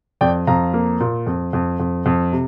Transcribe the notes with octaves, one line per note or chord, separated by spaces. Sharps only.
F2 D5 G5
F2 F5 A#5
A#3
A#2
F2
F2
F2
F2
C3